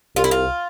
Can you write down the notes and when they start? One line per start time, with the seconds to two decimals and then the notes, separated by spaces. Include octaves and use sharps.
0.16 C2 F4
0.24 E4
0.31 F4